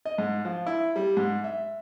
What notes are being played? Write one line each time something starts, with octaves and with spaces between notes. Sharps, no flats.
D#5
G#2
F3
E4
G3
G#2
E5